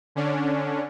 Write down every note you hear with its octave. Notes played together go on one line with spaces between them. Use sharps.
D3 C#4 D4